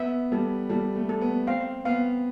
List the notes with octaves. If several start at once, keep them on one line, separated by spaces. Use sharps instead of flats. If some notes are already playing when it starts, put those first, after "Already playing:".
Already playing: B3 E5
G3 A4
G3 A4
A3
A4
B3
C4 F5
B3 F5